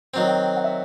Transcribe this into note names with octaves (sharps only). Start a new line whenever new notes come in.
D#3 F#3 C4
G5
G5
F#5
E5